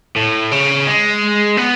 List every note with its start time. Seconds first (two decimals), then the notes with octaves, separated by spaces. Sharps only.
0.16 A2
0.52 C#3
0.87 G#3
1.57 B3